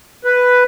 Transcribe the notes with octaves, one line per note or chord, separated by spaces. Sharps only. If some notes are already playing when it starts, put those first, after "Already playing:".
B4